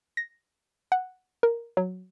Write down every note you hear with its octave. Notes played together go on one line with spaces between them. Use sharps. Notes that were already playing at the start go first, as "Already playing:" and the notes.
A#6
F#5
A#4
F#3